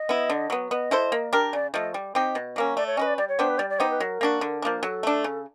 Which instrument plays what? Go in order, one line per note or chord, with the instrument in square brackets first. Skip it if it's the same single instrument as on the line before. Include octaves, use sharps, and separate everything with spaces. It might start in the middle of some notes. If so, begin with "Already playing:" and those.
Already playing: [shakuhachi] D#5
[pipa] B3 E4
D3
F#3 B3
[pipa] B3 [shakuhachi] D#5
[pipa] E4 A4 C5
A#3
D4 G4 A#4
[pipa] C#3 [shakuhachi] D5
[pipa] F3 A3 [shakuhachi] D#5
[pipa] G3
C4 D#4 G4
B2
F#3 A#3 C#4
[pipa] A3 [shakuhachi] D5
[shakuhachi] C#5
[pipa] C#4 F#4 B4 [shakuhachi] D#5
[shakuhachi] D5
[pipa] G3 [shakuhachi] D5
[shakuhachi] C#5
[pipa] B3 D4 G4 [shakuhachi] C5
[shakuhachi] B4
[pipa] G3 [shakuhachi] D5
[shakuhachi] D5
[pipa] B3 D#4 G4 [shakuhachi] C5
[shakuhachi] B4
[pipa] F#3 [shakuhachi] A#4
[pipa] A#3 D4 F#4
D3
F3 A#3 D4
[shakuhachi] A#4
[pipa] F#3 [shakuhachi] A4
[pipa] A3 D4
C#3